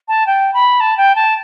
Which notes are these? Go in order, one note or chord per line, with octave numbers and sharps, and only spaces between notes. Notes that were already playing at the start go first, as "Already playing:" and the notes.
A5
G5
B5
A5
G5
A5